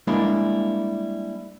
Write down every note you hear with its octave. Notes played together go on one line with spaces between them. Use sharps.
G3 G#3 A#3 D4 E4